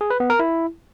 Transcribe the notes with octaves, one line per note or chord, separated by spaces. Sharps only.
G#4
B4
B3
A#4
E4